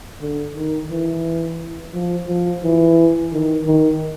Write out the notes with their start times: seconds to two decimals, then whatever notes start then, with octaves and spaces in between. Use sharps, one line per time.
0.21 D3
0.56 D#3
0.90 E3
1.94 F3
2.28 F3
2.64 E3
3.33 D#3
3.67 D#3